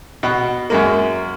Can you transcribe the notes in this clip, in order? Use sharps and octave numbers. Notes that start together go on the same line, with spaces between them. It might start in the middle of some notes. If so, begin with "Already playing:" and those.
B2 F#5
F#2 G#3 A#3